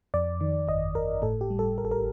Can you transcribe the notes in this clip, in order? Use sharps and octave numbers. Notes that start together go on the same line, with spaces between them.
F2 D5
D#3
G1 D#5
G1 A#4
A2 A4
G4
G3
A4
A1 A#4
A4
A#4